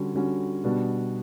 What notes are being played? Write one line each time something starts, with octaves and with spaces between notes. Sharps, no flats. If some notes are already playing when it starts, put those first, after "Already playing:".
Already playing: D3 G3 C#4 F#4
D3 G3 C#4 F#4
B2 G3 B3 D4 F#4